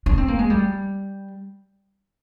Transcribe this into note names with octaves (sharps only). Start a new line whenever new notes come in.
D4
C4
A#3
G#3
G3